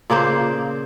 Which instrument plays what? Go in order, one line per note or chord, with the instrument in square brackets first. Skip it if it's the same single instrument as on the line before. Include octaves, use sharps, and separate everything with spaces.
[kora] A#2 C#3 A#3 C5